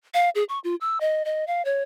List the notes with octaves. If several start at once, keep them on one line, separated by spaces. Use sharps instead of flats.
F5
G#4
C#6
F4
E6
D#5
D#5
F5
C#5